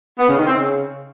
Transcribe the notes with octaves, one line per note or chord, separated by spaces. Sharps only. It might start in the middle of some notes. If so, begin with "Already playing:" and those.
B3
C#3
D#3
C4
C#3